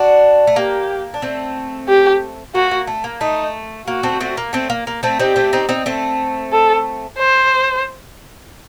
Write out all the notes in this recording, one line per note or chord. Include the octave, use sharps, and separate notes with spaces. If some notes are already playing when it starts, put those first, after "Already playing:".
Already playing: D4 F#4
A3
A#3 G4
D4
A3 C4
G4
A#3 F#4
A#3
A3
A#3
A3 D#4
A#3 F#4
A3 C4
A3 C4
A#3
A3 C4
A#3
A#3
A3 C4
C4 D#4 G4
A3 C4
C4 D#4
C4 D#4
A3 C4
A4
C5